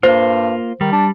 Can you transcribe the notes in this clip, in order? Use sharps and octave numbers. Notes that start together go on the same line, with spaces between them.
G2 A#3 F4 C5
D#3 G3
D4